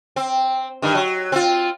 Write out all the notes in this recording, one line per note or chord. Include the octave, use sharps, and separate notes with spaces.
C4
G2 D#3
F#3
C4 F4